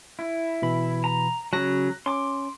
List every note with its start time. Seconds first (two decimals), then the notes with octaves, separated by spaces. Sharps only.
0.19 E4
0.62 B2 E3 B5
1.04 A#5
1.53 C#3 F#3 F#6 A#6
2.06 C#4 C6 D6